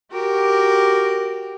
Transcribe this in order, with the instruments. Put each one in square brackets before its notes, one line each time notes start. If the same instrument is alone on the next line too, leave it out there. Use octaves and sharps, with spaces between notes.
[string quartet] F#4 G4 A#4